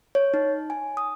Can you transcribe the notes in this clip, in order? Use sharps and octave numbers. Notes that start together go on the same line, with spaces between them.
C#5
D#4
G#5
D#6